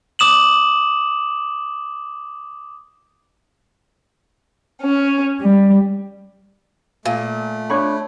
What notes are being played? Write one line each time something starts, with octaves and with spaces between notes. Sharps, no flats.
D6 D#6 E7 F#7
C#4
G3
A#2 A3
D4 C#5 B5